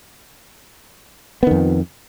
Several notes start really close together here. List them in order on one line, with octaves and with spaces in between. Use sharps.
B3 D#3 F2